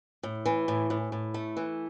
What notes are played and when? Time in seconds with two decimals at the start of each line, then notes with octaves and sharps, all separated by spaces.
0.23 A2
0.46 E3
0.68 A2
0.90 A2
1.12 A2
1.34 A3
1.57 E3